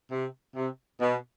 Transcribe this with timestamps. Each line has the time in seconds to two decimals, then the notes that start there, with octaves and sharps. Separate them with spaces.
0.12 C3
0.56 C3
1.01 B2